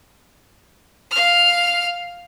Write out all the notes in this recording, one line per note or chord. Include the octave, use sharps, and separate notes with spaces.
F5 F6